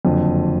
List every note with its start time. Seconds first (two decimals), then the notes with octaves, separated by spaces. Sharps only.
0.05 F#1 F2 D3